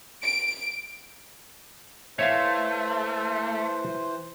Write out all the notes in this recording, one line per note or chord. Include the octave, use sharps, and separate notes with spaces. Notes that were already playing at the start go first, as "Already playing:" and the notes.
D7
E3 A3 C5 C#5 E5 F5